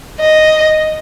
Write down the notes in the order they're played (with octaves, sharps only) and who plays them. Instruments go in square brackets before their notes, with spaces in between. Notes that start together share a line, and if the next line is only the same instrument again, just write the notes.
[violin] D#5